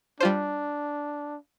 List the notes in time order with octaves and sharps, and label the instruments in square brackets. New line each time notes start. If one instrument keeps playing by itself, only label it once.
[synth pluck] G3 F4 C5 [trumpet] D4